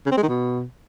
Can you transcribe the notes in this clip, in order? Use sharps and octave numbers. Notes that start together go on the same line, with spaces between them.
C#3
C4
G#3
D#3
B2